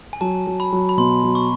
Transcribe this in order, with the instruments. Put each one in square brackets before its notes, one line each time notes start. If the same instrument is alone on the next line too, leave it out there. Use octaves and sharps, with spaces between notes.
[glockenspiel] G#5
[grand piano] F#3 [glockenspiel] A5
[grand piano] F#3
[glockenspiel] B5
[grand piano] F#3
[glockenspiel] B5
[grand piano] B2 [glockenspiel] C6
[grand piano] F#3
[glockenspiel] C#6